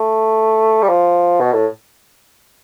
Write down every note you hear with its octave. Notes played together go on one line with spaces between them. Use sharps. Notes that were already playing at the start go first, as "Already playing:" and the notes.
Already playing: A3
G3
F3
B2
A2